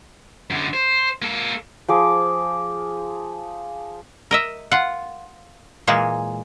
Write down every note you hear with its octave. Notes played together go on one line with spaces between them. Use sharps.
F#2 D3
C5
A#3 A4
F3 G#4 D6
A#4 D#5 E5
F4 F#5
A#2 E3 G#3 A#3 G#4